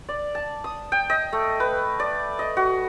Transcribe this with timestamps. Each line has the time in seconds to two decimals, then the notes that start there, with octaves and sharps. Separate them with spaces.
0.09 D5
0.35 A5
0.64 D#6
0.92 G5
1.10 D#5
1.33 A3
1.60 B4
2.00 D5
2.39 D#5
2.57 F#4